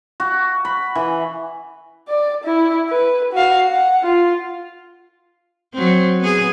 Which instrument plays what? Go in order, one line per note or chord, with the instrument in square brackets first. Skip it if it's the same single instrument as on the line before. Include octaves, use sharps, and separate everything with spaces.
[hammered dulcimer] F#4
B5
E3
[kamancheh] D5
E4
B4
F#4 F5
F#5
F4
[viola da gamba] F#3 C4
B3 G#4